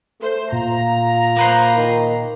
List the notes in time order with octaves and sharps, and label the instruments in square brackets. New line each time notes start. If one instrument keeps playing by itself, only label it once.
[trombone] A3 [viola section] C5
[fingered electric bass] A#2 [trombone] F4 [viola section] A#5
[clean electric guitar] A#3 B4 C5
[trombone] D#3